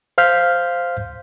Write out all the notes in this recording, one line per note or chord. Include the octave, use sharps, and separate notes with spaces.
C5 F5 F6 G6 B6